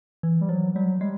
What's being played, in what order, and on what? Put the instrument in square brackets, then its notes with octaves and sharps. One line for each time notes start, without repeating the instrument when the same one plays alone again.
[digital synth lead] E3
[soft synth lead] G3
[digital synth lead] F3 [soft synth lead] F#3
[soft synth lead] F#3 [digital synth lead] G3
[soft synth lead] G3 [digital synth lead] G#3